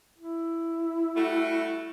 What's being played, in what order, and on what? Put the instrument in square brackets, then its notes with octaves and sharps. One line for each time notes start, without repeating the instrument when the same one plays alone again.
[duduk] E4
[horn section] G3 A3 F#4